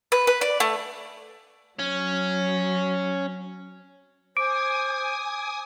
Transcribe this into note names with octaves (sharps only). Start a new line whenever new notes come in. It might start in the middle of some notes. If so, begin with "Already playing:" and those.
B4
B4
D5
A3
F#3 C#4
C5 G#5 D6 D#6 D7